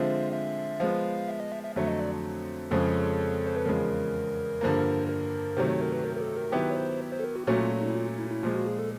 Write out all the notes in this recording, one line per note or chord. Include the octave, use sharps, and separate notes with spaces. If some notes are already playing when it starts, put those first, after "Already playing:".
Already playing: D3 F3 G#3 C4 F4 E5
E5
F3 G#3 B3 F5
E5
D#5
E5
E5
F2 D3 F#3 A3 E5
D#5
D5
F2 C#3 F3 G#3 C#4 A4
C5
B4
E2 C#3 F3 G#3 A#4
G2 D3 F3 A#3
A#4
C3 D#3 F#3 A3 C5
C#5
A#4
B4
A#4
A#4
A4
A#4
D#3 F#3 B3 E4 G4 B4
C#5
C5
C5
A4
A#4
F#4
A#2 F#3 A3 C#4 F#4
F4
F#4
D#4
E4
F4
E4
E4
A#2 F3 G#3 F4
F#4
G#4
A4